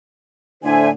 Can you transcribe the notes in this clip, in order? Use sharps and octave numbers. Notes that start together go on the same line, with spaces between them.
A2 D3 C5 E5 G#5